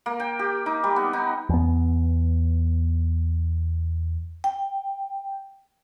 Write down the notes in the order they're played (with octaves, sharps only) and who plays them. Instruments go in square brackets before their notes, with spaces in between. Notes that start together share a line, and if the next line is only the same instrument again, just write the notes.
[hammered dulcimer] A#3
G5
G4
D#4
G3
B3
D#4
[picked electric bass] E2 B3
[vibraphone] G5